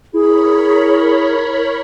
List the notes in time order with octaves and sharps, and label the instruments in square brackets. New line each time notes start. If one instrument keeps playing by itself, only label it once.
[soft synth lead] E4 [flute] G#4 [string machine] A#4 C#5 B5